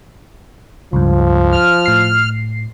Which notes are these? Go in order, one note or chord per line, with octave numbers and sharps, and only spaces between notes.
C#2 G2 F3
F6
A2 C7